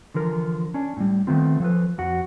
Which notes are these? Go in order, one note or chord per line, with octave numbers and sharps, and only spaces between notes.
D3 E3 F3 A#4
C#4 D4
A2 G3
D#3 A3 B3 C4 F4
F3 A4 B4
F2 F#4